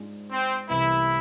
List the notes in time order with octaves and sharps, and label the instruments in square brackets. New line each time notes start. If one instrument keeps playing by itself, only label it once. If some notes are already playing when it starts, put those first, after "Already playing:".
Already playing: [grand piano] G#2 G#3 D4 F4
[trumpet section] C4
[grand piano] C2 C3 E3 B3 [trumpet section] E4